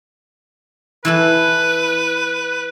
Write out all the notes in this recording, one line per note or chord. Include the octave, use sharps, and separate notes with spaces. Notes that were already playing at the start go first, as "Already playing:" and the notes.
E3 E4 A4 B4